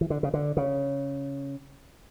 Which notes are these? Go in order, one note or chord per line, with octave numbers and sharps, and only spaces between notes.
E3
D3
C#3
D3
C#3